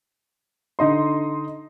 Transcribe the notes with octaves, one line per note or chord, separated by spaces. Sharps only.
D3 D#4 D#5 C6